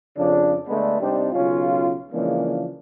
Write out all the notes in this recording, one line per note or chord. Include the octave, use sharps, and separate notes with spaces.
F2 C#3 D4
D3 G#3 A3 B3 D4 B4
C3 G3 C4 D4 D#4 G4
B1 C#3 C#4 F4
C#3 E3 F3 G#3 A#3 D4